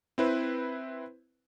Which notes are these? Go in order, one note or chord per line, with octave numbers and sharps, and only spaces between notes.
C4 E4 B4 C5